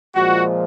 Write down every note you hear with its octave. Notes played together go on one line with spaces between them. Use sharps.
A#2 F3 G#3 F#4